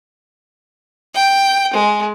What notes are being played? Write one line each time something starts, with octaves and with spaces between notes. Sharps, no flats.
G5
G#3